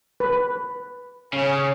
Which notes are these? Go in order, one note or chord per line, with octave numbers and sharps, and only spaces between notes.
B4
C#3 C#4